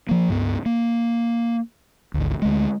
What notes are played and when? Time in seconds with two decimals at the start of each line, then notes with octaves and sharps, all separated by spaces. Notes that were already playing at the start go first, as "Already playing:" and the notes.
0.09 F3 A#3
0.29 C#2 G2 B3
0.66 A#3
2.14 G#1 D2
2.42 D2 G#3